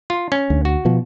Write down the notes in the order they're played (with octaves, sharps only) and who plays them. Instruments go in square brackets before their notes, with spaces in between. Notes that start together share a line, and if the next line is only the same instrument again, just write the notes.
[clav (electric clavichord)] F4
C#4
[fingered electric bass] D2
[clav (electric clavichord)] F#4
[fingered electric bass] B2 F3